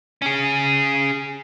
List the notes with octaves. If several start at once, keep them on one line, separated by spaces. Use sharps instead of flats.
C#4 G#4